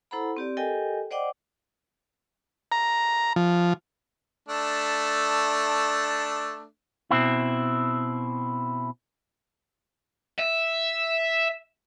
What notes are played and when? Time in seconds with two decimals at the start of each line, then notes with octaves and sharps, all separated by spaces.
0.11 E4 A4 C5 F#5 A#5 B5
0.37 C4 G4 D5
0.57 G4 A4 A#4 D#5 G5 G#5
1.11 C5 D5 D#5 F#5 G5 D6
2.72 A#5
3.36 F3
4.48 A3 D4
7.11 B2 C4 E4
10.39 E5